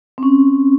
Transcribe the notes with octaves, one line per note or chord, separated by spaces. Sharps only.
C4
C#4